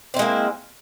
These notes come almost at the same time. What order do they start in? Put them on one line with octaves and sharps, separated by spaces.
C4 E4 G#3 A#3